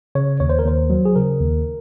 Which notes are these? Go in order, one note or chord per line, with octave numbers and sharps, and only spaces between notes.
C#3 C#5
D#2 C#5
C5
A#4
D#2 C5
F#3
G#4
C#3 A#4
D#2